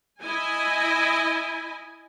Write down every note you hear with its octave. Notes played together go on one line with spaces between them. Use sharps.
E4 D#5 G#5